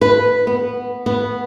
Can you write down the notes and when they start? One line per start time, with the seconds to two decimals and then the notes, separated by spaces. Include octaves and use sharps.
0.01 B4
0.47 B3
1.06 B3